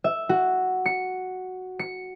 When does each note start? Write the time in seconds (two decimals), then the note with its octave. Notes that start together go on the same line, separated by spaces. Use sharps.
0.04 E5
0.29 F#4
0.86 C#7
1.79 C#7